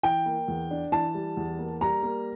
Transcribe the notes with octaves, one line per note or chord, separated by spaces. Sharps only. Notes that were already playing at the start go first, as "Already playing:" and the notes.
E3 G5
A#3
E2
D4
E3 A5
G3
E2
A#3
G3 A#5
A#3